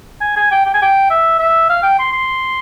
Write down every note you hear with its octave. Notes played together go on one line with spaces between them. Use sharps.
G#5
G#5
G5
G5
G#5
G5
E5
E5
F5
G5
C6
C6